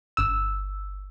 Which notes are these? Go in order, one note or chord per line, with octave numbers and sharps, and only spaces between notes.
G1 E6